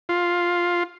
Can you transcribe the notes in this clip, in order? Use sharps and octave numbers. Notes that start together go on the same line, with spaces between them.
F4